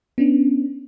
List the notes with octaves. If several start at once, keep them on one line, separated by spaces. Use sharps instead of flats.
B3 C#4 D4